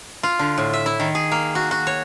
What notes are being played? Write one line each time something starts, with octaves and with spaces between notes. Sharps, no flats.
F4
D3
A2
E5
E4
D#3
G#4
A#3
F#4
F#4
C#5